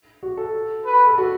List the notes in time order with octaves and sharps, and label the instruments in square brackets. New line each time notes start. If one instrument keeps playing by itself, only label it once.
[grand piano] F#4
A4
[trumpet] B4
[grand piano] A4
F#4